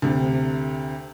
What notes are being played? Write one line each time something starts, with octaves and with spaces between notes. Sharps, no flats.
D2 C3